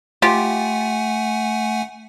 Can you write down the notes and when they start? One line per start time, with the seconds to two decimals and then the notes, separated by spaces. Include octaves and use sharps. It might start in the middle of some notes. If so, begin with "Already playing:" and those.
0.22 A3 F4 G4 F#5 G#5